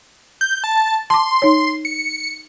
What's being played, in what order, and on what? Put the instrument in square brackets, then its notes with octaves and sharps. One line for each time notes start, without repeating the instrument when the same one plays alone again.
[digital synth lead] G6
A5
[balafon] A5 D6 [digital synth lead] C6
[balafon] D#4 C#5
[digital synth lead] C#7